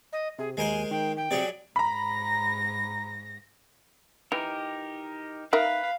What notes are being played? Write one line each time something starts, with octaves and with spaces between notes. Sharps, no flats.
D#5
C3 G#4
D#2 G#3 A#4 C5 G#5
D#3 G5
G5
C3 F#3 G#4 D5
G#2 A#5 B5 A#6
E3 D#4 G4 A#4
D#4 A#4 B4 E5 F5